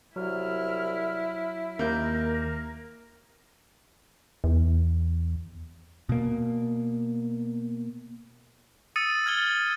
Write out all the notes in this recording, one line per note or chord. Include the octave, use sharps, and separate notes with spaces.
C2 F#3 E4 F6
D#2 A#3 A#4 G6
E2
B2 A#3
D#6 E6 A6 C#7 D#7
F6 G#6 A6 G7